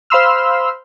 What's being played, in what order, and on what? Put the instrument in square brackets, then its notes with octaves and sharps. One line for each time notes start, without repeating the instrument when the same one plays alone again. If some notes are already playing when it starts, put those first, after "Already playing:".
[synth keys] C5 F5 B5 C6 E6 F6